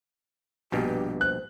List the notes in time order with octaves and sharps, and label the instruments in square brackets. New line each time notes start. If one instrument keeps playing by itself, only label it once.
[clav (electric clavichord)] A#1 G2 B2 [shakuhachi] G4
[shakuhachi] C5 [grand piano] F#6